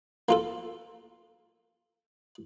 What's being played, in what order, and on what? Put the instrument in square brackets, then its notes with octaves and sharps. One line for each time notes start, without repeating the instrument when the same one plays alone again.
[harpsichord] A#3 F4 A4